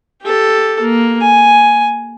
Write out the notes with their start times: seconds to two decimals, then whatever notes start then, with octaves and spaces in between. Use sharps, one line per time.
0.22 G4 A4
0.80 A#3
1.21 G#5